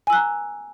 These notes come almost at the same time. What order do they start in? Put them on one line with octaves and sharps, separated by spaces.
G#5 E6 F#6 A#5